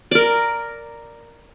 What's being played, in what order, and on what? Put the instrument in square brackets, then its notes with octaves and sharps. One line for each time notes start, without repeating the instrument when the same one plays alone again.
[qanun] A#4 D5